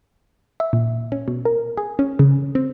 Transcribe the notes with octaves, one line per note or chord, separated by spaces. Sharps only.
E5
A#2
C#4
B2
A#4
G#4
C#4
C#3
C4